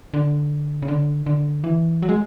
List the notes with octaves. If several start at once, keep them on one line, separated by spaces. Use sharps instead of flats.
D3
C#3
D3
D3
E3
F#3
G#3